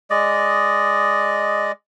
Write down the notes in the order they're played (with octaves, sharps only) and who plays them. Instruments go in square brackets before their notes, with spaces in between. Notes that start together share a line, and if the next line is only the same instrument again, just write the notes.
[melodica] G#3 D5 D#5